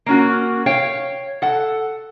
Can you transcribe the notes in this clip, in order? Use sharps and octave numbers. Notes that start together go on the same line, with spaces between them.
A#3 C#4 F#4
C#5 F5 G5
A4 F#5